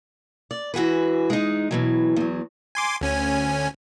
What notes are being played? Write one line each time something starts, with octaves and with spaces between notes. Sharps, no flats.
D5
E3 F#4 G#4 B4
G#3 D#4
B2 E3 F#3
E2 F#3
G#5 C6 D6
D2 C#4 G#5